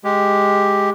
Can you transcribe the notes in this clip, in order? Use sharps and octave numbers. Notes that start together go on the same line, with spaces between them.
G#3 G4